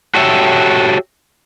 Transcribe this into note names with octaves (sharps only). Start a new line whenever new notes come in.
F#4 G4 A4 C#5 E5